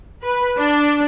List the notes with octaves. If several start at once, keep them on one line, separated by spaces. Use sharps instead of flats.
B4
D4